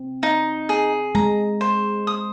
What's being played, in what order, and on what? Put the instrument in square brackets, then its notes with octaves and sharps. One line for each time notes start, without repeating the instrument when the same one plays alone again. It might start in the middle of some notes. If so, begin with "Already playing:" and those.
Already playing: [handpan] C4
[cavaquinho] D#4
G#4
[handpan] G#3 [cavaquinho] A#5
[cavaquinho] C5
D#6